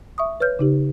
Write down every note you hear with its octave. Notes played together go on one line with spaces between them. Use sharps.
E5 C#6 D#6
B4 C#5 F6 G6
C#3 D#4 G4